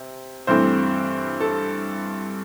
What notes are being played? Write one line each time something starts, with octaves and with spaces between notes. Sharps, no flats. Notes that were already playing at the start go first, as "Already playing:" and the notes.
Already playing: C3
G2 E3 A3 C4 C5
A4